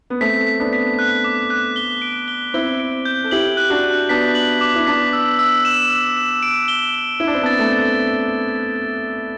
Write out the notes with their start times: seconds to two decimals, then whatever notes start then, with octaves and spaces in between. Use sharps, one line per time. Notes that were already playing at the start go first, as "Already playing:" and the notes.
0.10 B3
0.21 A3 C4 B6
0.47 B6
0.59 B3 D4
0.73 B6
0.99 F#6
1.24 D6
1.50 F#6
1.76 G7
2.02 D7
2.28 G7
2.54 C4 E4 G7
2.80 D7
3.05 G6
3.24 A4
3.31 E4 G4 F#7
3.57 F#6
3.70 D4 F#4
3.83 F#6
4.09 B3 D4 B6
4.35 F#7
4.61 D6
4.76 E4
4.87 B3 D4 B6
5.13 E6
5.39 E6
5.65 E7
5.90 E6
6.17 E7
6.43 D7
6.68 G7
6.94 G7
7.20 E4 G7
7.27 D4
7.34 C4
7.42 B3 D4 A6
7.59 A3 C4
7.72 A6